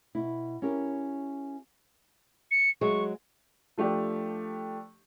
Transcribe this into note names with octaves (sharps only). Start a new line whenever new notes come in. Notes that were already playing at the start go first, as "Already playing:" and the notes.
B2 E4
C#4 E4 G4 A#4
C#7
F#3 G#3 C#6
F3 A3 D4 G4